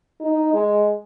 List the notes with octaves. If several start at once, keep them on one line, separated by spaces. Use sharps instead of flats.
D#4
G#3